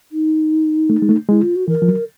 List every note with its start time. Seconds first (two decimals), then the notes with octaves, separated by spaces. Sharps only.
0.12 D#4
0.90 A3
1.02 G#3
1.09 A3
1.28 G#3 E4
1.42 F4
1.55 F#4
1.68 E3 A#4
1.82 F3
1.88 F#3